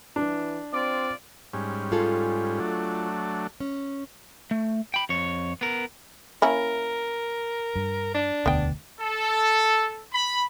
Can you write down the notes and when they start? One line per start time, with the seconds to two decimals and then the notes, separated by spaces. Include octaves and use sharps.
0.16 E3 D4
0.73 C4 F4 D5
1.53 G#2 G3 C#4
1.92 F4 G#4 A4
2.60 F#3 A3 D4
3.60 C#4
4.51 A3
4.94 G5 B5
5.09 F2 C#5
5.61 B3 A#4
6.42 A#3 C#4 E4 A#4
7.76 G2
8.14 D4
8.46 E1 D2 B3 G5
9.00 A4
10.12 B5